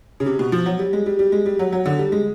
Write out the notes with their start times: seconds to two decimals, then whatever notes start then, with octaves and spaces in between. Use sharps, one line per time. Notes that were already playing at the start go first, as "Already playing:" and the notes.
0.20 C#3
0.26 C3
0.39 B2
0.52 F3
0.66 F#3
0.79 G3
0.93 G#3
1.06 G3
1.19 G3
1.32 G#3
1.46 G3
1.59 F#3
1.72 F#3
1.86 D3
1.99 G3
2.12 G#3